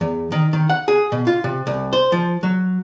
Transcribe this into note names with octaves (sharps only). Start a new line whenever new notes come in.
E2
D#3
D#3
F#5
G#4
B2
F4
C3
C2
C5
F3
F#3